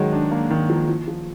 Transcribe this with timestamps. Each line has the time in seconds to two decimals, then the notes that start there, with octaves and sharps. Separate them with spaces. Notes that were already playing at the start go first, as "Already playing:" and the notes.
Already playing: D#3 F#3 G#3
0.12 D4
0.31 A#3
0.51 D#3
0.70 F3
0.89 F3
1.08 F3